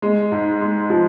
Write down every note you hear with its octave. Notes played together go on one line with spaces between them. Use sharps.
G#3
G#2
G#3
F3